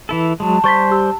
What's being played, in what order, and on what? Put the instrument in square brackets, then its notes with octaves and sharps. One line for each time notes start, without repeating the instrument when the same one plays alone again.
[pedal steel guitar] E3 E4 A4
[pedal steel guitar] F#3 G#3 [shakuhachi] A5
[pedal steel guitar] G3 C5 C6 [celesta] C#6 A6 B6
[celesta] G4 E6